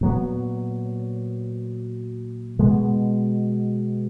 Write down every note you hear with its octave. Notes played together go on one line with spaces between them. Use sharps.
A#2 F#3 B3
B2 G#3 B3